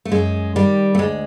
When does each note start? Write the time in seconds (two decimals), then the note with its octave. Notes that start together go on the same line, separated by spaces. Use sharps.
0.05 A3
0.12 F#2 G#3
0.56 D#3 G3
0.95 A3
0.99 D2 G#3